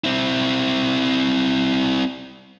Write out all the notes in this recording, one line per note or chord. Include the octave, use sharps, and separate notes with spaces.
C4 E4